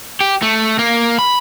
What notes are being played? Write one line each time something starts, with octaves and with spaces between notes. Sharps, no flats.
G4
A3
A#3
B5